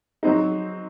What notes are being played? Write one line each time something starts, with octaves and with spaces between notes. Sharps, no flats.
F#3 C4 D#4